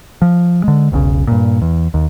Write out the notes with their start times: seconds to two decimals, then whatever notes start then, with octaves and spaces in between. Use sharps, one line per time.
0.22 F3
0.64 D3 G#3
0.92 E1 B1 A#2 C#3
1.27 G2 A#2
1.62 E2
1.94 D#2